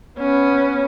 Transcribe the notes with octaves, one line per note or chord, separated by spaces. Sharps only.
B3 C#4